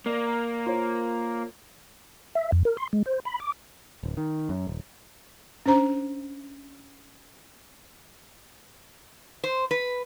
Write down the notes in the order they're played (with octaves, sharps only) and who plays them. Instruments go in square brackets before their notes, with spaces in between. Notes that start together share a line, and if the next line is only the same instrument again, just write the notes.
[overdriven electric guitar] A#3 [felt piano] D5
[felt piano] F4 C5 C#5
[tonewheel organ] E5
F2
A#4
C6
G#3
C5
B5
D6
[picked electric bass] D1
D#3
F#2
D#1
[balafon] C#4 D4 C5 A#5
[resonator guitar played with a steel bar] C5
B4